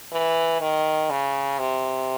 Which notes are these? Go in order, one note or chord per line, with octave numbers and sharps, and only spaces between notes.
E3
D#3
C#3
C3